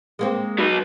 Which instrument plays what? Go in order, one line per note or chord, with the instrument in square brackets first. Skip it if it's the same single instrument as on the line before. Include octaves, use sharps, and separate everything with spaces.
[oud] G#3 A#3 C4
[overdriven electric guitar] F#3 B4